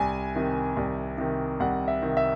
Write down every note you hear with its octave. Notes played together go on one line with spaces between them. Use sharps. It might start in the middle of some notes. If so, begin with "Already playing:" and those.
Already playing: C2 G#5
C3 D#3
C2
C3 D#3
C2 F#5
E5
C3 D#3
E5